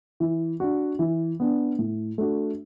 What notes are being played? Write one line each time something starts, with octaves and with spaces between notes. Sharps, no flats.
E3
D4 F#4
E3
B3 D4
A2
A3 D4 F#4